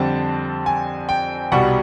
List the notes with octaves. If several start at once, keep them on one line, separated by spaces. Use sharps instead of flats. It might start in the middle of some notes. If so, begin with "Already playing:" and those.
Already playing: F2 D3 G3 C4 A5
G#5
G5
C2 B2 G3 F#5